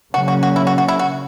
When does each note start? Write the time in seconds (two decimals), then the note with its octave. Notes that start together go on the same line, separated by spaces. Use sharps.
0.14 C#3 F#3 A#3 C#4 F#4
0.28 F#4
0.43 F#4
0.56 E4
0.67 F#4
0.78 F#4
0.88 E4
0.99 F#4